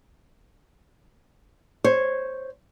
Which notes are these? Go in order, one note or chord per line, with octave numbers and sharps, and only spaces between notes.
C5 C#5